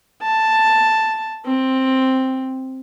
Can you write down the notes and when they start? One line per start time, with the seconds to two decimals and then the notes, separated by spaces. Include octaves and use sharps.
0.22 A5
1.45 C4